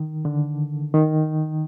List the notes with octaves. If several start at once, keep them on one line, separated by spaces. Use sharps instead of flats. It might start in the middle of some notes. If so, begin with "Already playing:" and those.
Already playing: D#3
D3
D#3